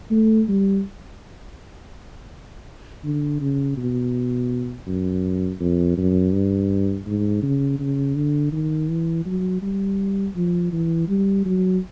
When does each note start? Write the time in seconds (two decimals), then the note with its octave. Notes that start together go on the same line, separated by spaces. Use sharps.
0.11 A3
0.48 G3
3.04 D3
3.41 C#3
3.77 B2
4.87 F#2
5.61 F2
5.97 F#2
6.33 G2
7.07 G#2
7.43 C#3
7.79 C#3
8.16 D3
8.53 D#3
8.89 E3
9.26 F#3
9.62 G3
10.36 F3
10.72 E3
11.08 G3
11.46 F#3